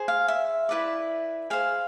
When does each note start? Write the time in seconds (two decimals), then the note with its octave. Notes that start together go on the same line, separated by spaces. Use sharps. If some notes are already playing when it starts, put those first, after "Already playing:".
Already playing: G#4 C5
0.08 F5
0.28 E5
0.69 E4 B4 D5
1.50 G#4 C5 F5